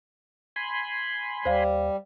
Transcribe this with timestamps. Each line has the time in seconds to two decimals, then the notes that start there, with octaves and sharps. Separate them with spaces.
0.56 G#5 B5 C6
1.45 D#2 G3 C5 F5